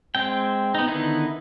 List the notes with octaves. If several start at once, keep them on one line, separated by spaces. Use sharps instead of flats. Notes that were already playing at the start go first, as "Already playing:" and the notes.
G#3 C4 G5
B3 D#4
D3 D#3 B3 D#4 E4